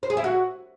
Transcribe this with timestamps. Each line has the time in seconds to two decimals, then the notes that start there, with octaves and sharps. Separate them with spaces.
0.03 C5
0.10 G#4
0.17 E4
0.24 F#4